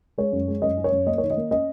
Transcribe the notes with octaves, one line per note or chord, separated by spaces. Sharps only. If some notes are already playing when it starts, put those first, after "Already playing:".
G#3 C#5
F#2
G#3
F#2 D#5
C#4
C#5
F#2
A#3 D#5
D#3 C#5
D#5
A#3
C#4 D#5